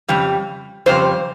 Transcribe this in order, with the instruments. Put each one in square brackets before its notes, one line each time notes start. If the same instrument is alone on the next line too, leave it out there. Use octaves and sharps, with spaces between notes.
[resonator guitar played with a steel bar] F2 C#3 G3
F2 C#3 G3 C5